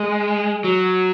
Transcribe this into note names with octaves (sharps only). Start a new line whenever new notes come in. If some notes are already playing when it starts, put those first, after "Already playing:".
Already playing: G#3
F#3